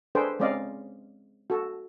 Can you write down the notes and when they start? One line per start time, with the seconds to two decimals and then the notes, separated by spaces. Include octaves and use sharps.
0.15 D4 G#4 A4 B4 C5 G5
0.40 G#3 C4 C#4 D5 D#5 F5
1.50 F#4 A4